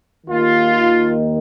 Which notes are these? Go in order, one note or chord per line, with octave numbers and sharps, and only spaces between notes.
D#2 D#3 F4